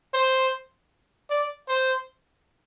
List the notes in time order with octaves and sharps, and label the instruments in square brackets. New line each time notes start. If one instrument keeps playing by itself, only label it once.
[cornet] C5
D5
C5